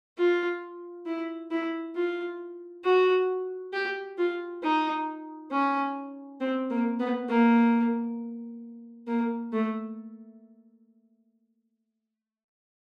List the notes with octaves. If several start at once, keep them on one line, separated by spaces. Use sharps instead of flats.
F4
E4
E4
F4
F#4
G4
F4
D#4
C#4
C4
A#3
B3
A#3
A#3
A3